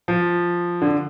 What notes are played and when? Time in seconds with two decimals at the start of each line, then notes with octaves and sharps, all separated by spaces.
0.08 F3
0.82 D3